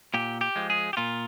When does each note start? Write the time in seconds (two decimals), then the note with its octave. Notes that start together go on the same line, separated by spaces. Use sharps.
0.14 A#2 G4
0.41 G4
0.56 F3 G#3
0.70 G#4
0.93 G4
0.97 A#2 F4